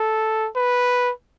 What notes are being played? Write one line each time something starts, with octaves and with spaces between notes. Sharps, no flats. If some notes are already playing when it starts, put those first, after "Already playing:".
Already playing: A4
B4